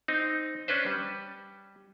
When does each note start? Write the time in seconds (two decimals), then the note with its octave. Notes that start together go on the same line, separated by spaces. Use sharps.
0.08 C4 D#4
0.68 C#4 D4 B4 C5
0.86 G3